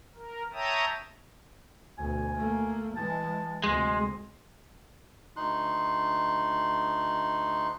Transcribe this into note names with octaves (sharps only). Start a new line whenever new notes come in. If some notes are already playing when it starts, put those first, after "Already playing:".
A#4
C#5 E5 G5 A5 A#5 D#6
D2 B2 G#5
A3 A#3
E3 G#3 A5
D2 C3 G#3 C6
D2 D#4 C6 F#6